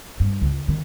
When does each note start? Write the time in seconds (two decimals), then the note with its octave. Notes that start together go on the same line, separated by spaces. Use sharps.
0.20 G2
0.41 C#2
0.68 D#3